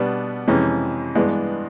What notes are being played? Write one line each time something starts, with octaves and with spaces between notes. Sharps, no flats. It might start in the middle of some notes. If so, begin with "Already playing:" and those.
Already playing: B2 G3 B3 D4
F2 C3 E3 G#3 C#4
G2 E3 G#3 B3 D4